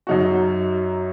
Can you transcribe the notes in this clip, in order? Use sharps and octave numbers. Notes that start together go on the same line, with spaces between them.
F#2 F#3 D#4 F#4